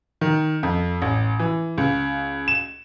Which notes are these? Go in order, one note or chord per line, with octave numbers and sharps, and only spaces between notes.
D#3
F2
A1
E3
C#2
E7